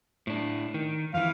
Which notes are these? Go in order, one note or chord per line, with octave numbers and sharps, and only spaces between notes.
A2 D4
D#3
F2 E3 F5